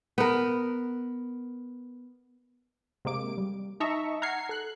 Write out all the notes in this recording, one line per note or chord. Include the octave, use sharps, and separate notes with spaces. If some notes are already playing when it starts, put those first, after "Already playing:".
B3 A#4
C3 G#3 A#3 D6 D7
G3
D#4 D#5 E5 A5 A#5 C#6
F#5 A#5 F6 G#6 C7 C#7
A4 F#6